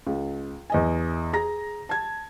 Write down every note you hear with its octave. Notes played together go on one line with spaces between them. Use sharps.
C#2
E2 D#5 G#5
G#4 A#5 A#6
A5 G#6